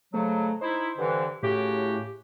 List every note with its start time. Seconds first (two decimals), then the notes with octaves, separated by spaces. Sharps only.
0.14 G#2 C#3 F#3 A3
0.61 D#4 E4 C5
0.98 G2 D3 E3
1.43 A2 C#3 F#4 G4